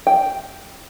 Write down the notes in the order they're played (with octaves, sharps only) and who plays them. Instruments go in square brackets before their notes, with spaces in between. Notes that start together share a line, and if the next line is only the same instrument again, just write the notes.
[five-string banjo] G5